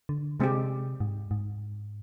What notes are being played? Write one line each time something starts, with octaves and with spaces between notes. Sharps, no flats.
D3
C3 G#3 C4 G4
G#2
G#2